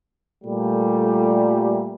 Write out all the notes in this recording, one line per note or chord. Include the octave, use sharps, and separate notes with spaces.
A#2 G3 A3